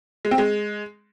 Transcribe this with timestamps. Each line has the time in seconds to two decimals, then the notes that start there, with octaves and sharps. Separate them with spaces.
0.25 G#3
0.31 C4
0.38 G#3